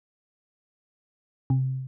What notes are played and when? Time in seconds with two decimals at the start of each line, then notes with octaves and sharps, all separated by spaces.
1.50 C3